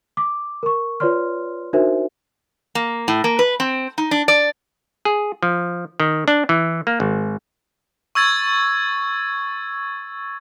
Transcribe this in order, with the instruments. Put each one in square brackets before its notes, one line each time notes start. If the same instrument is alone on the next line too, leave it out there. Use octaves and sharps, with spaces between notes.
[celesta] D6
A#4 C#6
F4 B4 C#5 D5 C6 F6
D4 D#4 F#4 A#4 C5 E5
[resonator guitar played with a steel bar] A#3
A2
A#3
B4
C4
D#4
D4
D5
[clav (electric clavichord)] G#4
F3
D#3
D4
E3
A#3
G#1
[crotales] C#6 E6 G#6 A6